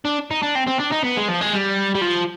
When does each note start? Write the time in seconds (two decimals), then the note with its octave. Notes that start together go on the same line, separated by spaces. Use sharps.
0.05 D4
0.31 D#4
0.42 D4
0.55 C4
0.67 C4
0.79 D4
0.91 D#4
1.04 B3
1.17 G#3
1.28 F3
1.41 G#3
1.53 G3
1.95 G3
2.02 F3